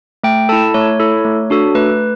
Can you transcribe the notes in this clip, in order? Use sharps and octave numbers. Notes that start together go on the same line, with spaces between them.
A3 G5
E4 A4 A5
A3 C#5
E4 A4
A3
D4 F#4 A4
A3 B4